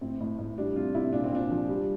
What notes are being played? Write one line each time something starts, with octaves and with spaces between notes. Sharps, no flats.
A2 C4
A2
A2
G3 D4
C3 F4
C3 E4
A#2 D4
C4
A#2 D4
F3
G3